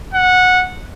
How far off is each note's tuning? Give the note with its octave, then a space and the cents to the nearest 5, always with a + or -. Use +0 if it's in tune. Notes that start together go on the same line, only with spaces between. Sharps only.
F#5 -15